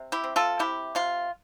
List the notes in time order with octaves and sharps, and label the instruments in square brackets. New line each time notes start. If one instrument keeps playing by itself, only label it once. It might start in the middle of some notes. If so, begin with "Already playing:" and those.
Already playing: [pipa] C3
E4 G4
C4
F4 A4
C3 E4 G4
C3 F4